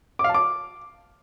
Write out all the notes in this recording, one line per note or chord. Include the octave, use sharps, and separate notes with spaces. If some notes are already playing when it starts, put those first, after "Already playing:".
D6
F5
A5
D6